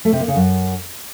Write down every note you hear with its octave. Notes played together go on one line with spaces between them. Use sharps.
A3
C3
A#3
C#3
F#2